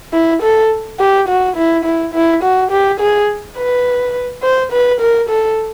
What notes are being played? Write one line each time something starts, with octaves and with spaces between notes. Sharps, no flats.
E4
A4
G4
F#4
E4
E4
E4
F#4
G4
G#4
B4
C5
B4
A#4
A4